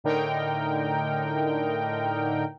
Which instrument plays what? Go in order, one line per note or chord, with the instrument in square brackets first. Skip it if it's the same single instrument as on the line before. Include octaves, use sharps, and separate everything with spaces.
[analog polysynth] A2 D3 D#4 A#4 G5